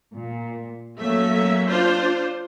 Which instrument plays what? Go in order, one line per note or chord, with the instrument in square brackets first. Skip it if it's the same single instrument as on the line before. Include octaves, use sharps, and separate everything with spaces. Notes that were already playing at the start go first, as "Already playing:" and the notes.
[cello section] A#2
[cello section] F#3 A#3 C#4 [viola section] A3 E5
[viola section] D4 F4 C5